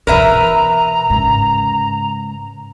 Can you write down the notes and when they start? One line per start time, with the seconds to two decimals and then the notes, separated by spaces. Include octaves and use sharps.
0.07 B2 E3 A#4 B4 E5 A#5
1.10 G#2 C#3